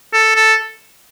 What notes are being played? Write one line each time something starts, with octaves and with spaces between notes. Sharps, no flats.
A4
A4